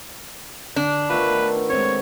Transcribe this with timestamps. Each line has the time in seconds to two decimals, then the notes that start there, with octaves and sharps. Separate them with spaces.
0.76 D3 D4
1.10 D#3 A3 B3 F4 B4
1.70 G#3 C4 C#5